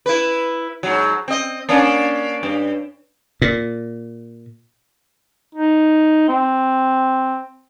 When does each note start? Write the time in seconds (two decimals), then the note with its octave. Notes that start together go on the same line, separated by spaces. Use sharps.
0.06 E4 B4
0.83 G#2 F#3
1.28 C4 D#5
1.69 A#3 C#4 D4
2.43 G2
3.42 A#2
5.55 D#4
6.29 C4